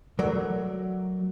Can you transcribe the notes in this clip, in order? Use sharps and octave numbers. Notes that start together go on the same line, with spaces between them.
F#3 A3 A#4 D5